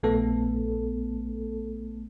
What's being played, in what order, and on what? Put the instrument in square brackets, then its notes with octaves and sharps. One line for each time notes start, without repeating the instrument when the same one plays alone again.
[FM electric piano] A#1 A3 B3 A4